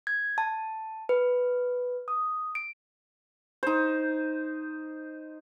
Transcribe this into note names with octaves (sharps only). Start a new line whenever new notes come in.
G#6
A5
B4
D#6
D7
D#4 C5